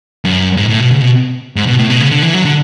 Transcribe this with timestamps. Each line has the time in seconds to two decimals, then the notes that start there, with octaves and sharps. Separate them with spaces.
0.25 F#2
0.57 G#2
0.69 A2
0.80 B2
0.91 C#3
1.02 B2
1.56 G#2
1.67 B2
1.79 A2
1.90 B2
2.01 C#3
2.11 D3
2.23 E3
2.34 F#3
2.45 D3